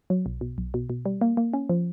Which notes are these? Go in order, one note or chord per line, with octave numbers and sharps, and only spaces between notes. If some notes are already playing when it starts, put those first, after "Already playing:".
F#3
B1
B2
B1
B2
B2
G3
A#3
A#3
C#4
F3